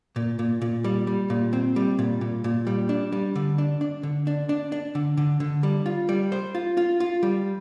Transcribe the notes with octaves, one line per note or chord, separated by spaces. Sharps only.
A#2
A#2
A#2
G3
G3
A#2
C4
G3
A#2
A#2
A#2
G3
D4
G3
D3
D4
D4
D3
D4
D4
D4
D3
D3
D3
G3
F4
G3
C5
F4
F4
F4
G3